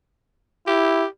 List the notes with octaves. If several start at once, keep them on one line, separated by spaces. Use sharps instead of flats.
E4 G4